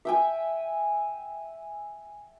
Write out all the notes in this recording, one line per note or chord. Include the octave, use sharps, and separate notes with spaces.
E5 G5 G#5